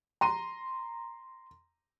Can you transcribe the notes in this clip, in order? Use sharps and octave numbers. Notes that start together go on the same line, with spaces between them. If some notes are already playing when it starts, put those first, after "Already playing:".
A#5 C6 D#7